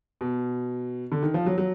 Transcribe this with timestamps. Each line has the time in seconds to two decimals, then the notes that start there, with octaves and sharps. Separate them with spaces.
0.21 B2
1.12 D3
1.23 D#3
1.34 F3
1.46 F#3
1.58 F#3